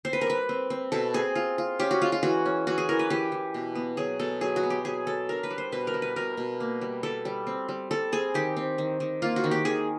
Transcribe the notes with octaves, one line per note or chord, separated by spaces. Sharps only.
C4 C5
B4
A#4
G3 B4
C4
C4
B2 A4
C4 G#4
F4
F4
C#4 G4
F#4
G#3 F4
F4
E3 F#4
C#4
E3 F#4
G#4
E3 A#4
B4
E3 G4
E3
B2
B3
F#3 G#4
B2 A4
F#3 G#4
F#4
B3
G4
F#3 G#4
F#3 A4
D4 A#4
B4
G3
C5
B2 B4
A#4
G3
B4
B2 A#4
B2
A#3
G3
G3 A4
G3
C4
G3
G3 A4
C4 G#4
D#3 G4
C4
D#3
D#3
A#3 F4
F#4
D#3
G4
D#3 G#4